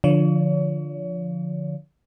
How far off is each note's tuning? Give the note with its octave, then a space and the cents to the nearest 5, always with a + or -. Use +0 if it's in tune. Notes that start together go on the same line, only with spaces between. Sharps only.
D3 +0 F3 +0 C#5 +40